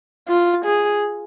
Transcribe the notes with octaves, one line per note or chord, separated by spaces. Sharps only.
F4
G#4